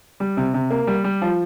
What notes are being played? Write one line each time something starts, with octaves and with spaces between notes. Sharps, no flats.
G3
C3
C3
A#3
G3
G3
F3